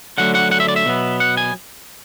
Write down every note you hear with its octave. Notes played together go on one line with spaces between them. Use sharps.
D3 F#3 A3 F#5
F#5
F#5
E5
D5
E5
B2 F#3 B3
F#5
G#5